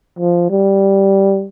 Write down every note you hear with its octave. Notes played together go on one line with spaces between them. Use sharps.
F3
G3